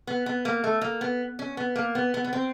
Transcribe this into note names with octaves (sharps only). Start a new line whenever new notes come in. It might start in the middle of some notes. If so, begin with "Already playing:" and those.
B3
B3
A#3
A3
A#3
B3
C#4
B3
A#3
B3
B3
B3
C4